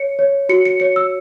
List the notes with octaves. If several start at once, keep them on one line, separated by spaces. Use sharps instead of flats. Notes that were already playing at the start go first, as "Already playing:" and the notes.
Already playing: C#5 C#7
C#5
F#4 C#7
C#7
C#5 C#7
E6